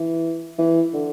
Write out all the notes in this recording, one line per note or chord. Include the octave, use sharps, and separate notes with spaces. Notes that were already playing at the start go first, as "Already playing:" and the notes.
Already playing: E3
E3
D3